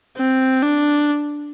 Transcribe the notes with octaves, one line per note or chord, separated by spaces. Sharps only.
C4
D4